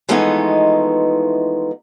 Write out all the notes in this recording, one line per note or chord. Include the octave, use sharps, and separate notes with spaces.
E3 F3 G#3 A3 B3 D#4